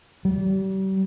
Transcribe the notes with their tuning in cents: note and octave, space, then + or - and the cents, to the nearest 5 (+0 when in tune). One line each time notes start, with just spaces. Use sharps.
G3 -40